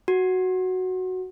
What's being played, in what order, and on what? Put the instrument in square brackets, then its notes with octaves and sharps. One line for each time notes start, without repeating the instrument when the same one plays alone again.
[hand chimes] F#4